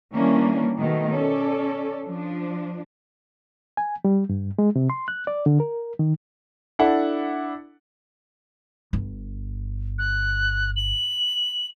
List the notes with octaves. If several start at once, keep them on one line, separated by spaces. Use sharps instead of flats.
D#3 E3 G3 A#3 C#4 D4
B2 D#3 A3
C#4 A4 D5
F3 D4
G#5
G3
G2
G#3
C3
C6
F#6
D5
D3
A#4
D#3
D4 E4 A4 F#5
G1
F#6
F#7